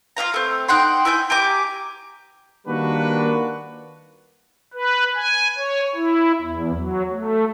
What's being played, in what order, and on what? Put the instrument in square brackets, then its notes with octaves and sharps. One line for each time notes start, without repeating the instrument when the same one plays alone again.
[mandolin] F4 G4 F5 A#5
A3 C4
D#4 F#5 G5 C6
E4 G#5 A5 G6
G4 G#5 A#5 D6
[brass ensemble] D#3 G3 A#3 D4 F#4 B4
[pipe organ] B4
G#5
C#5
E4
E2
F#3
A3